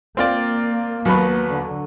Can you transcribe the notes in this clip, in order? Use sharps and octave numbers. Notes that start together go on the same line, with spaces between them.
A#3 C4 F4 D5
D#2 F#3 B3 B4
D3